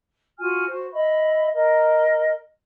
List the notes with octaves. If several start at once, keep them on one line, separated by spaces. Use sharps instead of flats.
F4 F#4 G#5 F6
F#4 C5
D#5 E5 B5
A#4 D#5